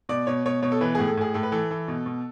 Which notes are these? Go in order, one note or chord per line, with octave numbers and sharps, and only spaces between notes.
B2 D5
B2 C#5
B2 C#5
B2 C#5
A4
E3 B4
A2 G#4
A4
A2 G#4
A2 A4
B4
E3 A4
E3
B2
B2